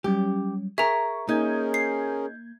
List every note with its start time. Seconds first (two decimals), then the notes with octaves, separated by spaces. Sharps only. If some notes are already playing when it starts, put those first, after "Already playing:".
0.04 F#3 G3 C#4 G4
0.78 G#4 A#4 E5 A#5 C#6
1.29 A#3 C#4 D#4 G#4 A#4 G6 G#6
1.74 C7